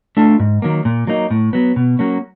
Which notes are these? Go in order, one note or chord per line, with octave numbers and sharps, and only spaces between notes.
A3 D4 F4
G#2
D#3 F#3 A#3
A#2
F#3 A#3 D#4
A2
F#3 B3
B2
F#3 A#3 C#4